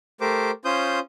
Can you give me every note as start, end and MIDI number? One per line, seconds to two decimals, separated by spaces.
0.21 0.51 57
0.21 0.51 67
0.21 0.51 70
0.21 0.51 72
0.21 0.51 86
0.65 0.99 61
0.65 0.99 65
0.65 0.99 72
0.65 0.99 87
0.65 0.99 91